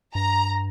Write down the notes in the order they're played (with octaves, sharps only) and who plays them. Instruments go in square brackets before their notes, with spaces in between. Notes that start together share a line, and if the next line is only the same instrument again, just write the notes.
[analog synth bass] G2 [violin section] A#5